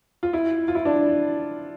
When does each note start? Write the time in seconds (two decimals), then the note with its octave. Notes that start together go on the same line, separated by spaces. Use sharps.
0.23 F4
0.33 E4
0.68 F4
0.75 E4
0.85 D4